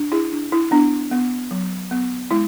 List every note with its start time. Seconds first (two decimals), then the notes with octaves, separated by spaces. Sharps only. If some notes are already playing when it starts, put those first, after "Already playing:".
Already playing: D4
0.12 E4 G#4
0.32 D4
0.52 E4
0.71 B3 D4
1.11 B3
1.51 F#3
1.91 B3
2.31 G#3 E4